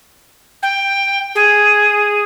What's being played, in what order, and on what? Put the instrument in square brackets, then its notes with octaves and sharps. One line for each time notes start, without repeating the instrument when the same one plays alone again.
[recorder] G5
G#4